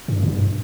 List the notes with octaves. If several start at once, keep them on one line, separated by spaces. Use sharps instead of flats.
G2
G#2
G2